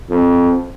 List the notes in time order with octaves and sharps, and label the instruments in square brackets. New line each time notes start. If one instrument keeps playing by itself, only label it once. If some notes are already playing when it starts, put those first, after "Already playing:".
[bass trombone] F2